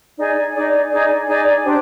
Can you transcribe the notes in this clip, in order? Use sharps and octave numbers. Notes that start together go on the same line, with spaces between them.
D#4 G#4 D5
D#4 G#4 D5
D#4 G#4 D5
D#4 G#4 D5
D4 G4 C5